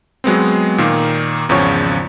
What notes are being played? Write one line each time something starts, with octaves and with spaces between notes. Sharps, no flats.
F#3 G#3 B3 C4
A#2 D#3 A#3
G#1 E2 C#3 F3 C#5 C#6